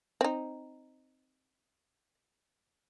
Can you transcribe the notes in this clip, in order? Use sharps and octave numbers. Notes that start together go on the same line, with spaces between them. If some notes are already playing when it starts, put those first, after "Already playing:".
C4 D#4